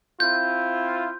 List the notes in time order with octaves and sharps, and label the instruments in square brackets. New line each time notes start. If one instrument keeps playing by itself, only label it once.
[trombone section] C4 E4 F4 [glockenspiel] G6